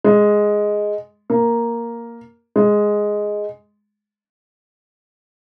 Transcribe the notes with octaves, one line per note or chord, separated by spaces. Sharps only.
G#3
A#3
G#3